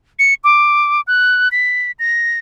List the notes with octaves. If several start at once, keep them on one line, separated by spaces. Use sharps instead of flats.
C#7
D6
F#6
B6
A#6